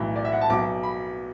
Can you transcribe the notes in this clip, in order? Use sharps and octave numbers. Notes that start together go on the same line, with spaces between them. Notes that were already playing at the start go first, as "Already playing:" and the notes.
Already playing: B1 A2 E3
D5
E5
F#5
A5
B1 B2 F#3 D6
B5